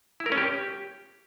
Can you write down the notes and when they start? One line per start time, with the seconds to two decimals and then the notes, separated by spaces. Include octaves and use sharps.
0.20 E4
0.26 A#4
0.32 C#4
0.38 G4